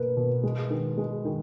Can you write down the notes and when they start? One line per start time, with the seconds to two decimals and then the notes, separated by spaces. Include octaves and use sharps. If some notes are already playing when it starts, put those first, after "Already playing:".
Already playing: B2 A#3 B4
0.17 B2
0.43 G#3
0.70 D#3
0.97 G#3
1.25 D#3